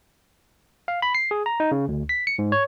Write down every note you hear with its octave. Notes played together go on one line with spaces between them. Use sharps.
F5
B5
C7
G#4
A#5
D#4
C#3
D2
B6
C#7
G#2
C#5